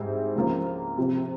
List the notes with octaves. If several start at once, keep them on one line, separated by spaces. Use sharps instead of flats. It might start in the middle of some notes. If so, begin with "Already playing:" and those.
Already playing: G#2 G3 C4 E4
C#2 C#3 F3 A#3
C3 F3 C4